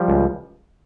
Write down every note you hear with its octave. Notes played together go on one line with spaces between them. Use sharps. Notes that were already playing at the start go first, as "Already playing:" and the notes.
Already playing: F3 G3
C#2